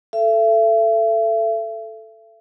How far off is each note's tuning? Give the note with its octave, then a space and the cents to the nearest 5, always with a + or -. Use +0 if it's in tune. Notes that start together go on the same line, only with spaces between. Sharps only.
A4 +0 E5 +35